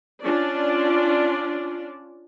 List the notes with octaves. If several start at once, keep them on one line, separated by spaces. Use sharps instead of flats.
C#4 D4 F4 D5